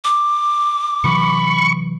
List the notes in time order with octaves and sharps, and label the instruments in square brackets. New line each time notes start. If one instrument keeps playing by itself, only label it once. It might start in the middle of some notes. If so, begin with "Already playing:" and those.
[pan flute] D6
[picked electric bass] C3 E3 F#3 [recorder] B5 [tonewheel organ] C#6